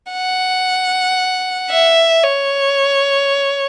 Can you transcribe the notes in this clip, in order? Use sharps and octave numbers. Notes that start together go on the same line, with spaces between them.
F#5
E5
C#5